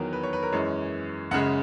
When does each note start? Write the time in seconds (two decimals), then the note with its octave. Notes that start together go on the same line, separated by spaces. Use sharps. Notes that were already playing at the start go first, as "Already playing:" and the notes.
Already playing: E2 D#3 F#3 A#4
0.13 B4
0.23 C#5
0.33 B4
0.43 A#4
0.52 F#2 E3 G#3 C#5
1.31 F#2 F#5
1.34 C#3 G#3